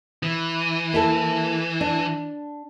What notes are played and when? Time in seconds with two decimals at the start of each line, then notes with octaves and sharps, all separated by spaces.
0.23 E3
0.93 A#3 E4 A4
1.81 D4